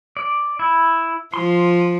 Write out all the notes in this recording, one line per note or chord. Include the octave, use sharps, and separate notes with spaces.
D5
E4
F3 C6